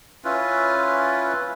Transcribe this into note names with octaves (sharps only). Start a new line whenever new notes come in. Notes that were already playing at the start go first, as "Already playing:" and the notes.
C#4 E4 F4 B4